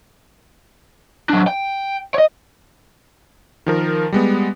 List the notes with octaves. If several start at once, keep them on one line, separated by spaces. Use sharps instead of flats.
F#3 D4
G5
C#5 D#5
D#3 F3 A#4
G3 G#3 B3